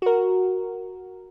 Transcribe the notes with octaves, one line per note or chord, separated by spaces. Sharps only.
F#4 A#4